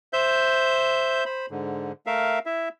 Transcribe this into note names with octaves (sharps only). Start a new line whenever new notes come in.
C5 E5 G6
C5 B5
G#2 D3
A3 A#4 E5 F5
E4 E5